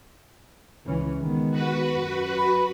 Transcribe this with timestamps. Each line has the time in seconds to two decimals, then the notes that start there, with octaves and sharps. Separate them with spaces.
0.85 C#2 E3 C#4
1.20 D#3 G#3 B3
1.51 F#4 B4
1.92 F#2
2.39 B5